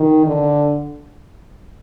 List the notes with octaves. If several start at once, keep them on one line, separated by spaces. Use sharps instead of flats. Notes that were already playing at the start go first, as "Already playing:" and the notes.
Already playing: D#3
D3